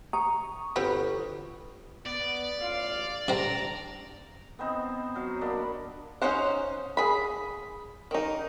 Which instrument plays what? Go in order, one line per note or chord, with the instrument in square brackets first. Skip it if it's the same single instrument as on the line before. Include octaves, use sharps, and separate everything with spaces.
[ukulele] A#5 [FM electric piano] C#6 D#6
[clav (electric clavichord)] G1 G4 [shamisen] C4 F#4 B4
[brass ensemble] B3 [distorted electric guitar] D5
[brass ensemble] A1 F4 F5
[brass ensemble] A1 D4 A#5 [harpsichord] C3 C4
[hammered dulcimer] B3 C4 D#4 C5
F#3 F5
A#3 D4 D#5 B5
[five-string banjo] C#4 D#4 C5 F#5
G#4 B5
D#3 D#4